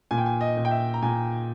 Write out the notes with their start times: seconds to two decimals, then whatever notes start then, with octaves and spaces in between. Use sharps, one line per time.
0.11 A#2 G#5
0.18 G5
0.26 G#5
0.41 D#5
0.57 A#2
0.65 G5
0.71 E5
0.94 A#5
1.02 A#2 G#5